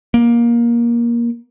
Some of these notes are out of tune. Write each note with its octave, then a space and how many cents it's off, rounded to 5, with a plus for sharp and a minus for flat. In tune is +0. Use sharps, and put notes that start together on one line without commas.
A#3 +20